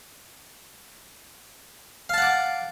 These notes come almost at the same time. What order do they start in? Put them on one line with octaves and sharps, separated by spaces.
F5 A5 F#5 D6